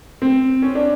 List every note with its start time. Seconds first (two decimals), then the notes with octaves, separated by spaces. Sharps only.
0.22 C4
0.62 C#4
0.75 D4